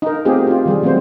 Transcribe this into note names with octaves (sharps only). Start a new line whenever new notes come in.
D#4 A#4
A3 B3 C4 F4 G4 G#4
F4 G4
D#3 G3 G#4
D#3 F#3 A3 B3 C4 C5